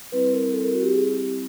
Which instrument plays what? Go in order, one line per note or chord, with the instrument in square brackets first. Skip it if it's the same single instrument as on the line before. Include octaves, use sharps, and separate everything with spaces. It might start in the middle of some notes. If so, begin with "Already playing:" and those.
[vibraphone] G3 C4 E4 B4
A#4
A4
A#4
F#4
G4
G#4
G4